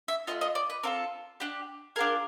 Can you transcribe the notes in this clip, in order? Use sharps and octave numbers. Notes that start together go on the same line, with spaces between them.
E5
A3 C4 F4 D#5
D#5
D5
B4
C4 F4 A4 A#4
D4 G4
D4 F4 G#4 A#4